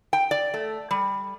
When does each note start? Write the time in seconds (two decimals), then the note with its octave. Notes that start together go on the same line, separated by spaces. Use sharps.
0.13 G5
0.31 D5
0.54 A3
0.91 G3